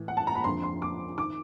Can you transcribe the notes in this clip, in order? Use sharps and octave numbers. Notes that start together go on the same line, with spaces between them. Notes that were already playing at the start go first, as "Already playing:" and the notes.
Already playing: A2 E3
F#5
A5
A#5
B5
F2 D3 F3 C6
C6
D6
D#3 D6